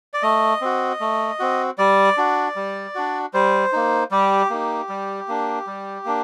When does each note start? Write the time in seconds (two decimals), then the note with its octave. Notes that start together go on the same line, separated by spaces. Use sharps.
0.14 D5
0.22 A3 D#5
0.61 C4 F#4
1.00 A3
1.39 C4 F#4
1.78 G3 D5
2.17 D4 F#4
2.56 G3
2.95 D4 F#4
3.34 G3 C5
3.73 A#3 D#4
4.11 G3 G4
4.50 A#3 D#4
4.89 G3
5.28 A#3 D4
5.67 G3
6.05 A#3 D4